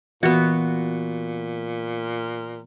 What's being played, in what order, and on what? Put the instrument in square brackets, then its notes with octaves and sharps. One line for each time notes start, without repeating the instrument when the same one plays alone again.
[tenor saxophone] A#2 [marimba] E3 [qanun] B3 F#4